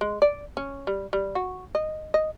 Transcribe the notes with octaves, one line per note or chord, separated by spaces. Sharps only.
G#3
D5
C#4
G3
G3
F#4
D#5
D#5